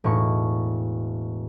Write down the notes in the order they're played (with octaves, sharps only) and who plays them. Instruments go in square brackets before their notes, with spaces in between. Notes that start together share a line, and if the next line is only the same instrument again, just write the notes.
[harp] E1 A2 C#6